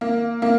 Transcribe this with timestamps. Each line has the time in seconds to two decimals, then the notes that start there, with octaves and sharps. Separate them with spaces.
0.01 A#3
0.42 A#3